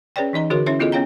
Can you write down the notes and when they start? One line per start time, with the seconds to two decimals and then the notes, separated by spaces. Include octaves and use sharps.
0.16 C#4 G#4 B4 C#5 D5 G5
0.33 E3 D#4 D#5 A#5
0.50 D3 F#4 G#4 A#4 C#5 C6
0.66 C#4 E4 C#5 E5 C6
0.79 B3 E4 F4 G#4 A4 D#5
0.92 B3 C#4 C#5 F5 G5 A#5